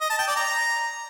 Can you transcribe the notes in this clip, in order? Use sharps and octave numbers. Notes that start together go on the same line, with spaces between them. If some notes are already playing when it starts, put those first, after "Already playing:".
D#5
A5
G5
D5
A#5